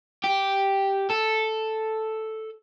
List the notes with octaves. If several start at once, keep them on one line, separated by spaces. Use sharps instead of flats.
G4
A4